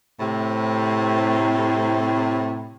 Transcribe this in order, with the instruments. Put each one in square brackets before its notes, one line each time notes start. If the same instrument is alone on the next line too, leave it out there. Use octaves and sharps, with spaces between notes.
[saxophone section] A2 C3